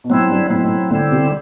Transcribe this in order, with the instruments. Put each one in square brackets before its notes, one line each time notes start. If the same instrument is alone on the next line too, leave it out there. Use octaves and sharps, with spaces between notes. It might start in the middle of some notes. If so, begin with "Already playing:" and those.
[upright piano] B2
[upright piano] A2 [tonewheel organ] F#3 C4 E4
[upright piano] G2
[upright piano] A2 [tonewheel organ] F#3 C4 E4
[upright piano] B2
A2
[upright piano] A2 [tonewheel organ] D3 G3 C4 E4
[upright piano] C3